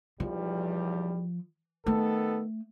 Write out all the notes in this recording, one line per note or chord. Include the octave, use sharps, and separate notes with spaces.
B1 E2 F3 G3
D#3 A3 B3 A4